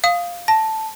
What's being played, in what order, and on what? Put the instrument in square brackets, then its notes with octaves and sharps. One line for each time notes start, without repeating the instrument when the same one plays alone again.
[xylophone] F5 D#6
[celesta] A5 [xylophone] A#6